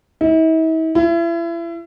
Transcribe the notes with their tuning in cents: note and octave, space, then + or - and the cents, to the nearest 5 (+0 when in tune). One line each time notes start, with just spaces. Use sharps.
E4 -45
E4 +35